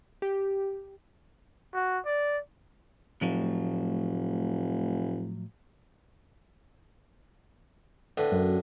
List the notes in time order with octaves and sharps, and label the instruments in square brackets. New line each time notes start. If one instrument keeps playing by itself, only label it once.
[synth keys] G4
[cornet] F#4
D5
[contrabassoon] F1 [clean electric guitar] A2 F3 F#3
[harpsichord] A2 D3 B4
[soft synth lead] F#2